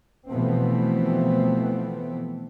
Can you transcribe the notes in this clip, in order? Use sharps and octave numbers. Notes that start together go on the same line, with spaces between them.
B2 E3 F3 A3 B3 C4